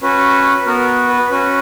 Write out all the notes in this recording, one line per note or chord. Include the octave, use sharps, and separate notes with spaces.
C#4 F#4 B4
B3 F#4 A#4
B4
C#4 F#4 B4